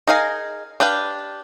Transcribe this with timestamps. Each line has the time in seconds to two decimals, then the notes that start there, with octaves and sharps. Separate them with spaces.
0.07 D#4 G#4 A#4 F5 G#5
0.80 D4 G4 B4 F5